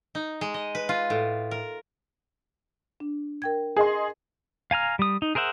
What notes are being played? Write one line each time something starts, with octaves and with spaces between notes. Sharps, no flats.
D#4
G#3
D#5
B4
F4
A2
A#4
D4
A#4 G5 G#6
G#4 D#5 C6
F5 G#5 A#5 F6
G3 D#6
D#4
G#4 A#4 C5 E5 F#5